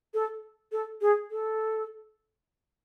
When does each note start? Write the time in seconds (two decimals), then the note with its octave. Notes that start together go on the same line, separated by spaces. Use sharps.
0.14 A4
0.72 A4
1.02 G#4
1.31 A4